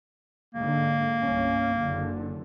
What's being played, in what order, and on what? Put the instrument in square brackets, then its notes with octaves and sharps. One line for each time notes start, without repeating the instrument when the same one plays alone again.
[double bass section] G#2 D3 [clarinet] A#3
[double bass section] G1 C2 C#4
F#1 D3